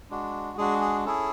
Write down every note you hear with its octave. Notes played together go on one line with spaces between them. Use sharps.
G#3 D4 F#4
G#3 D4 F#4 G#4
G#4
C#4 E4 G#4 A4